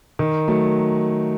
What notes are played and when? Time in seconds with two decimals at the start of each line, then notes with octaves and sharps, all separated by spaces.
0.19 D#3
0.48 F#3 A3